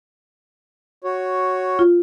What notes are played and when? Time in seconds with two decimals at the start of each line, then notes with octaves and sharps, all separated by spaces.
1.04 F#4 C#5
1.79 F4